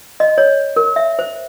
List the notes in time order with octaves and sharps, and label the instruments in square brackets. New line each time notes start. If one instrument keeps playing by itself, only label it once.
[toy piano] D#5
C#5
A#4
E5
C5